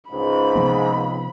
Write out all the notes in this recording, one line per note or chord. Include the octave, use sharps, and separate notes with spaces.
C#2 G#2 B5
C3 F3 B3